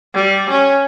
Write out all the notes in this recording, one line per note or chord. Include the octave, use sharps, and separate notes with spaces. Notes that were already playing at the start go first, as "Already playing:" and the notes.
G3
C#4